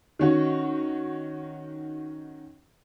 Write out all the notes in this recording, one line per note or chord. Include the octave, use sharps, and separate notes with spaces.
D#3 C#4 F#4